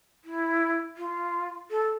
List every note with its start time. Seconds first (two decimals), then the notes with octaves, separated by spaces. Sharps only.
0.24 E4
0.97 F4
1.70 A4